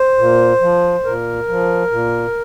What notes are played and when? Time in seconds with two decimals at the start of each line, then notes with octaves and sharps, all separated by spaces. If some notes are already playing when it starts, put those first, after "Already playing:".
Already playing: C5
0.18 A#2
0.61 F3
1.05 A#2 A#4
1.49 F3
1.91 A#2